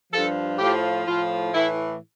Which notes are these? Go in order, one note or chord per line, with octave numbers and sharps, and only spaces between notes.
G2 F3 A4
A2 F3 G4
A2 F3 F4
A2 E3 E4